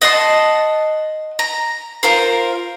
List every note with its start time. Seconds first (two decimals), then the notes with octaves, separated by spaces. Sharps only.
0.02 D#5 F#5 A5 C6
1.39 A#5
2.03 F4 A#4 C5